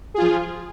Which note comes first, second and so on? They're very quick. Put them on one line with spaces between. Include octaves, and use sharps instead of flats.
G#4 F4 F3